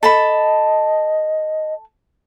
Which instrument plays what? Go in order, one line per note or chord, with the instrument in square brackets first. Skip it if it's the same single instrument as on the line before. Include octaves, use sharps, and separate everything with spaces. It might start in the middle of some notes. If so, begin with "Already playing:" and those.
[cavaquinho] A4 A5 B5 [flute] D#5